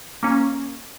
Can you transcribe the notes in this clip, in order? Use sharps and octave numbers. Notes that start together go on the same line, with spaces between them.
A#3 C#4